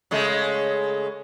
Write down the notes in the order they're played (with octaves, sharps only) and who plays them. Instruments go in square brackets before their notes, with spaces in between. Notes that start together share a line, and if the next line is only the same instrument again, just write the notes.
[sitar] C#3 G#3 A3